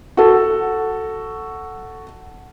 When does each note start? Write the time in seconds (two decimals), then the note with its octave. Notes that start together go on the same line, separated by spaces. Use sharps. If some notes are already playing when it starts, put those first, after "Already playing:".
0.17 F#4 A4